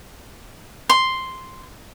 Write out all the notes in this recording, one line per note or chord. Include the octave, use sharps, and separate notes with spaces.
C6